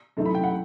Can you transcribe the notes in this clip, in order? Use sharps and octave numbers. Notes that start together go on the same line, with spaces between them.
F#2 E3 A3 C4 D#4
B5
G5
F#5